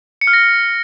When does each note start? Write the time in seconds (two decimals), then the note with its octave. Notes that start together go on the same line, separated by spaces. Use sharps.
0.21 C#7
0.27 F6
0.33 A#6